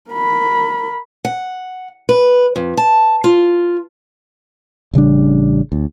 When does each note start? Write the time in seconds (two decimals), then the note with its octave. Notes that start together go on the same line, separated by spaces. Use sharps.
0.11 A#4 B5
1.25 F#5
2.09 B4
2.56 F2
2.77 A5
3.24 F4
4.94 A1 C#3 G3 D4
5.72 D2